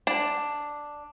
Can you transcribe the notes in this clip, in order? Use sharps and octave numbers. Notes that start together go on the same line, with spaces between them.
D4